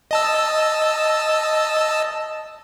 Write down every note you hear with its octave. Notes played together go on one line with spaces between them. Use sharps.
D#5 A5 E6